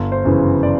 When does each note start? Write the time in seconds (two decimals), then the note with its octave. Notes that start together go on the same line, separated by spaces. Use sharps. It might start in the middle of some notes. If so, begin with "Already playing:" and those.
Already playing: G1
0.12 C5
0.25 F#2 C#3 E3
0.63 D5